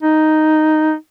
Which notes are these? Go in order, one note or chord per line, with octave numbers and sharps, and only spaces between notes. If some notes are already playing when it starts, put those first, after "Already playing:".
D#4